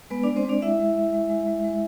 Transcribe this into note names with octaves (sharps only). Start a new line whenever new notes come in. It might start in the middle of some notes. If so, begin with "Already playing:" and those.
G#3 B3 B4
G#3 D4 D5
C4 C5
G#3 D4 D5
G#3 E4 E5
G#3
G#3
G#3
G#3
G#3
G#3